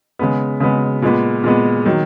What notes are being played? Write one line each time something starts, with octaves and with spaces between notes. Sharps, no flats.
C#3 G#3 B3
C#3 G#3 B3
A#2 G#3 B3
A#2 G#3 B3
D#3 F#3